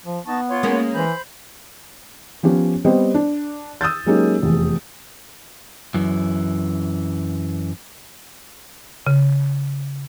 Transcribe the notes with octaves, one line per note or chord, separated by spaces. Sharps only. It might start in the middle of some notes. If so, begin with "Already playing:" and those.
F3
B3 D#4 A5 C#6
F4 C#5 C6
G#3 A#3 C#4
E3 C5 B5 G6
F3 B3 C#4 G4 C#5
G3 B3 C4 C5 D#5
D4
D#6 E6 G6 A6
F#3 G#3 A#3 C#4 D#4 G4
F1 E2
F#2 E3
C#3